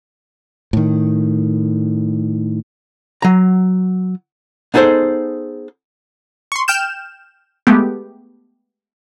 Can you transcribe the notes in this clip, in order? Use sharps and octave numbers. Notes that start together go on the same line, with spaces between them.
A2 D#3
F#3 A#5
B3 D#4 G#4 A4 C5
C6 C#6
G5 F6 G6 E7
G#3 A3 B3 G4